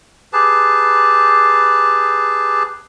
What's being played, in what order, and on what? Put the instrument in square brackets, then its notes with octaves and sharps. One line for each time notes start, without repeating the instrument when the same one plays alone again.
[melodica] G4 G#4 B4 A5